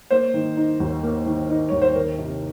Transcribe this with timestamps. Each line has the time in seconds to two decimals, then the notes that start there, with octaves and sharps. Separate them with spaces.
0.11 A#3 C5
0.34 D#3
0.57 D#4
0.80 D#2
1.03 A#3
1.26 D#3
1.50 D#4
1.69 D#2 C#5
1.82 C5
1.95 D#3 A#4
2.18 C3